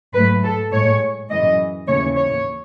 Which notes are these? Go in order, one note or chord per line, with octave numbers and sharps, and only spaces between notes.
G#2 F#3 A3 B4
A4
A2 G#3 C#5
F#2 E3 G#3 D#5
D#2 C#3 E3 A3 C#5
C#5